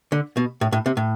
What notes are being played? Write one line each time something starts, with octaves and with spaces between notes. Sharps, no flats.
D3
B2
A2
A2
C3
A2